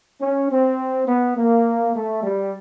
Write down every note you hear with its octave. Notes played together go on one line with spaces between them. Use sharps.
C#4
C4
B3
A#3
A3
G3